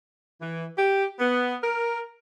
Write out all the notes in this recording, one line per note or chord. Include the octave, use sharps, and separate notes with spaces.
E3
G4
B3
A#4